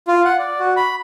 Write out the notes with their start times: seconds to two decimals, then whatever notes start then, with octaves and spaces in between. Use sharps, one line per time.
0.08 F4
0.25 F#5
0.39 D5
0.60 F#4
0.77 B5